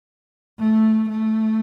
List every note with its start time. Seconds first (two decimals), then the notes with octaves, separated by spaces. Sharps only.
0.59 A3
1.09 A3